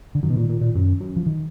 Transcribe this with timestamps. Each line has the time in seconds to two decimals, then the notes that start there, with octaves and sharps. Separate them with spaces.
0.15 D3
0.23 F#2 D#3
0.30 B2
0.37 A#2
0.49 A#2
0.61 A#2
0.75 F#2
1.00 F#2
1.16 F3
1.26 D#3